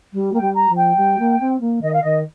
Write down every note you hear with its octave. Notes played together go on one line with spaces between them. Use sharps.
G3
A#3 G5
G3
A#5
F3
G5
G3
A#3
C4
A#3
D#3 D#5
F5
D#3 D#5